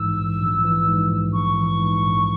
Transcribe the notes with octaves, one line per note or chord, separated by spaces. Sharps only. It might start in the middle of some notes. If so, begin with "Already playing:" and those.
Already playing: A#1 G#2 E3 E6
A#1
A#1
E3
G#2
A#1
A#1 C#6
E3
G#2
A#1